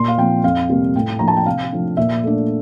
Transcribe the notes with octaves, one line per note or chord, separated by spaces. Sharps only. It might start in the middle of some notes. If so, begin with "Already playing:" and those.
Already playing: A#2 C6
F5
F3 C4 G5
F2 F5
C3 G3 A#3
A2 G5
F3 A#3 D4 A#5
A5
G5
C3 F5
F3 A3 D4
A#2 E5
A3 D4